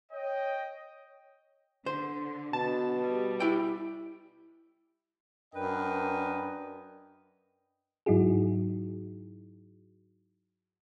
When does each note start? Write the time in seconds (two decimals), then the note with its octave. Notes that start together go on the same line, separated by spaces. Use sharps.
0.12 C#5 D#5 G5
1.86 D3 C5
2.53 B2 A5
2.99 G3
3.40 E4 G5
5.54 F#2 D4 A#4 B4 D#5 G5
8.06 G#2 F#3 D#4 E4 F#4 G#4